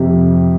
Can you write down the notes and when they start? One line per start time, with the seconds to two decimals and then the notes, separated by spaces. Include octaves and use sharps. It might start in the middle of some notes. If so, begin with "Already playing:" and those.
Already playing: F2 C3 G4